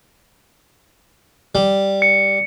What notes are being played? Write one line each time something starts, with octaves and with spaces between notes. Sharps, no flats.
G3
C#7